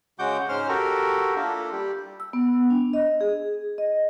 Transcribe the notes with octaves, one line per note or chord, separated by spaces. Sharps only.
C#3 G#3 F#4 F#5 D6 G6
G#2 G#3 C#4 C5 C6 F6
F#4 G4 A4 A#4
A#3 D4 E4 F4 A4
G3 G4
E6
B3
D4
D#5
G#4
D#5